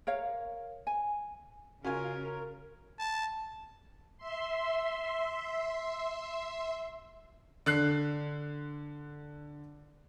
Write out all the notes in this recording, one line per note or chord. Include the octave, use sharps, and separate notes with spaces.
A#4 C#5 F5
G#5
C#3 C#4 F4 F#4 A#4 G#5
A5
E5 C6
D3 F#6 C7